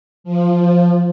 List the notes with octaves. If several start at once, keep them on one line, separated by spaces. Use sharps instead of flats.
F3